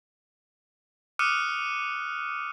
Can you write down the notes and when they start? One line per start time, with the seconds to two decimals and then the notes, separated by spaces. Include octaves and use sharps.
1.19 D6 D#6 F6 F#6 C#7 D#7